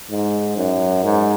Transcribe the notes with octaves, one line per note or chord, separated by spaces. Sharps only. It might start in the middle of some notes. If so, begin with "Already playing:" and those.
G#2
F#2
G#2